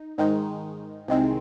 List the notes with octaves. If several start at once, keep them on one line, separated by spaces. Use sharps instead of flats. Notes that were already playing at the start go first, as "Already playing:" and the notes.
Already playing: D#4
G#2 D#3 G#3 D#4
C2 C3 D#3 G#3 C4